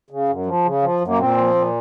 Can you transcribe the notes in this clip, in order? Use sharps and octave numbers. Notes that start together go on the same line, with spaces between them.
C#3
F#2
F3
C#3
F3
F#2
A#3
A#2 C4
F3
A#2